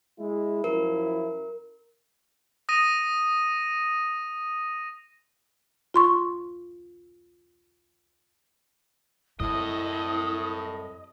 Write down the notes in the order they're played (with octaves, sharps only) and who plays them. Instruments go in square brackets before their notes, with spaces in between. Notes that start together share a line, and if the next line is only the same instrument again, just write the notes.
[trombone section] G#3 E4
[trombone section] F#2 F3 E4 [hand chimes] A#4
[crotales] D#6 A#6 D#7
[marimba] F4 C6 C#6
[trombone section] C2 A2 [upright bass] F#2 [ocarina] E4 [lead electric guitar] D#5